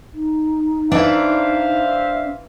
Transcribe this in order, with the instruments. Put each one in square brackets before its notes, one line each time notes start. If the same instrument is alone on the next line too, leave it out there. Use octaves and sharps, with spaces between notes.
[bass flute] D#4
[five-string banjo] E3 E4 [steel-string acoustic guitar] D4 D5 [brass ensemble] C5 E5 F5